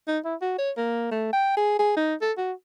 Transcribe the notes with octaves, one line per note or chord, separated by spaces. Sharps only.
D#4
E4
F#4
C#5
A#3
A3
G5
G#4
G#4
D#4
A4
F#4